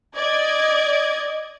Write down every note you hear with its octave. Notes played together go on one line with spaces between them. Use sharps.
D5 D#5 G#6